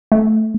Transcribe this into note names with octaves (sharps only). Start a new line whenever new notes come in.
A3